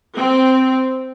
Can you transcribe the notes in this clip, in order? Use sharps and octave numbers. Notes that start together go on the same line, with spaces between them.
C4